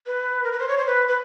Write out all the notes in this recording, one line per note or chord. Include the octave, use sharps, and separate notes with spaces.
B4
A#4
B4
C5
C#5
C5
B4
B4